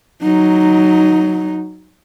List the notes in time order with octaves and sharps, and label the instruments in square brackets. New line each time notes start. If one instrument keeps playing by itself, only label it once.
[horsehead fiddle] F#3 D#4